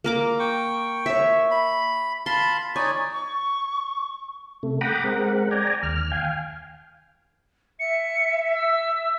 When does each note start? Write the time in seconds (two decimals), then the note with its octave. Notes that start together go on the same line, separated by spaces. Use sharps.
0.04 A#3 A#4 D6
0.39 G5 C#6
1.06 C#5 E5
1.51 B5
2.26 F5 A5 B5 C6
2.76 D#4 C#5 D5 G#5
3.12 C#6
4.63 C3 A3
4.81 F#5 G5 A#5 B5 D6 D#6
5.04 G#3 C4 A#4 F#5
5.51 D5 G5 G#5 A#5
5.83 D#2 F6
6.12 F5 G5 G#5
7.79 E5 C#7
8.54 E6